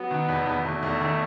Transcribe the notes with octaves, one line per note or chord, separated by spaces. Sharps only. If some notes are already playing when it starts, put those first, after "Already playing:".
Already playing: F#3 B3
D#3
E2
E2
E2 A3
E2
D#3